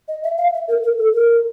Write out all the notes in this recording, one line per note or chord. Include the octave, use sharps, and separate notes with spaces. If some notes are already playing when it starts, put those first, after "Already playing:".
D#5
E5
F5
E5
A#4
A#4
A4
A#4